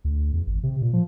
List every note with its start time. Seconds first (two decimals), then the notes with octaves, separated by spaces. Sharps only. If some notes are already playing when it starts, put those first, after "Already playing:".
0.05 D2
0.33 E2
0.47 G#1
0.63 C3
0.82 A#2
0.93 F3